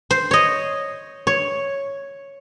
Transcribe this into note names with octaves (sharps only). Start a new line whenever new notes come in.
C5
C#5 D#5
C#5